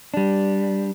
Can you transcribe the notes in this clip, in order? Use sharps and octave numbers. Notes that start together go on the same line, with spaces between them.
G3 D4